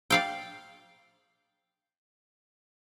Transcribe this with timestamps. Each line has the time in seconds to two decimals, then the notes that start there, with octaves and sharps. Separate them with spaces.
0.10 D5 F5 G5